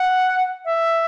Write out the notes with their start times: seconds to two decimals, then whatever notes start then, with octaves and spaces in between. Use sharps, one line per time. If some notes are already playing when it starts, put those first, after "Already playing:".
Already playing: F#5
0.65 E5